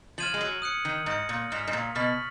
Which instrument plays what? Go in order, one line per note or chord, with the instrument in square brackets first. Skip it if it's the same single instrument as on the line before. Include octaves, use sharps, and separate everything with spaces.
[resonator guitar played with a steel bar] F3 [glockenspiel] F6 G#6 D#7 F#7
[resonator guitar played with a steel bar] G#3
F#3
[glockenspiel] D#6 F#6 C#7
[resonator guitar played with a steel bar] D#3
[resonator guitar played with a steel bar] G#2 [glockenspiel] D#6 A#6 C#7
[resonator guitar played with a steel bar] A#2
[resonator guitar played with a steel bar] G#2 [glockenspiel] F6 B6 F7
[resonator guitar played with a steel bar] G#2
A#2
[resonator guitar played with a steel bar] B2 [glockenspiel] C#6 F6 B6 F#7